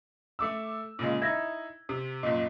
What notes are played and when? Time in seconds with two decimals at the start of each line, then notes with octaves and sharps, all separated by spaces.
0.39 A3 D6 E6
0.99 A#2 C#3 G#3
1.22 D#4 E4 G#6 A#6
1.89 C3
2.23 F#1 A#2 D#5